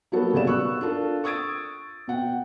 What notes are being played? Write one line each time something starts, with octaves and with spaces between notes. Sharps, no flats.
F#3 G3 A#3 B3 F#4 A4
B1 C#3 G3 D5 E7
B3 C#6 E6 F#6
D4 F4 A4 A#4
C#6 D#6 E6 G#6 A6 D7
B2 F#5 G5